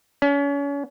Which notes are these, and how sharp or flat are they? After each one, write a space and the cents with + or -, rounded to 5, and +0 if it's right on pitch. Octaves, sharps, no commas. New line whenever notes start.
C#4 +35